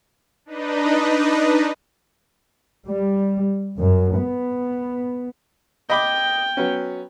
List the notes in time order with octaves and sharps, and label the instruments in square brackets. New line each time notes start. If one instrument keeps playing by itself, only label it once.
[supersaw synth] D4 D#4 B4 D#5
[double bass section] G3
F#2
B3
[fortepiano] D#5 B5 D6 [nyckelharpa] G5
[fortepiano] F#3 B3 C#4